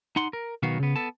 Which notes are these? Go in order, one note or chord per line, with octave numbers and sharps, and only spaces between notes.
D#4 F#5 C6
A#4
B1 D#3 F#3 B3 F#4 F5
C#3 B3
B3 A4 A5